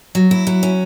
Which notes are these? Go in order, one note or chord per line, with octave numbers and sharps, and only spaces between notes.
F#3
E4
F#3
C#4